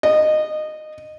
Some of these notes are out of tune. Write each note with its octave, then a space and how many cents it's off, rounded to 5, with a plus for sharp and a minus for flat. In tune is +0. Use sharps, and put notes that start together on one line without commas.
D#5 -20